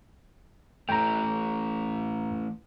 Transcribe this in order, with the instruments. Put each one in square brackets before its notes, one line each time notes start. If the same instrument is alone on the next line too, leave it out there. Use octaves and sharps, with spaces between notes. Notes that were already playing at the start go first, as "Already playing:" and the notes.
[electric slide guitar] E3 A3 [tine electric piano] G5 A#5